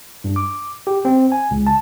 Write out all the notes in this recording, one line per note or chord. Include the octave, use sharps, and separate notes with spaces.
G2
D6
G4
C4
G#5
C#2
A5